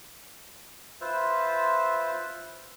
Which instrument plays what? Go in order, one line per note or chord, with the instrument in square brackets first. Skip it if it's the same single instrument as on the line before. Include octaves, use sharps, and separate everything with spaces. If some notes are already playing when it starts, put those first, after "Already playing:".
[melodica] F4 B4 C5 E5